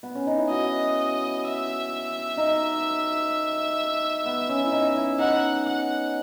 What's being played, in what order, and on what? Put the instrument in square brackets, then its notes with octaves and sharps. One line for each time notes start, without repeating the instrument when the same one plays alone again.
[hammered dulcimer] B3
C#4
D#4
E4
[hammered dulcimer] F#4 [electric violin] D#5
[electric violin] E5
[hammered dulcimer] D#4
B3
C#4
E4
D#4
E4
[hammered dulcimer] D#4 [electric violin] F#5
[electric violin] F#5